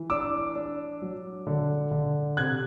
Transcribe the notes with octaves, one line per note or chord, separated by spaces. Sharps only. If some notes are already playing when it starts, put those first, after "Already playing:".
Already playing: E3
D4 D6 E6
D4
F#3
D3
D3
C3 F#6 G#6